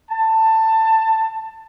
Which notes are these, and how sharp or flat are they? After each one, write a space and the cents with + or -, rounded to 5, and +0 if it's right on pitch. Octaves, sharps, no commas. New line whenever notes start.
A5 +15